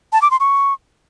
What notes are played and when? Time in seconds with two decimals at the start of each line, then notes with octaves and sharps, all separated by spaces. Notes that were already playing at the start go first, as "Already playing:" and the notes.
0.12 A5
0.22 D6
0.31 C6
0.40 C#6